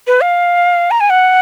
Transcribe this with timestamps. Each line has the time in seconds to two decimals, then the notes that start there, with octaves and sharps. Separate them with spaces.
0.07 B4
0.21 F5
0.91 A#5
1.00 G#5
1.10 F#5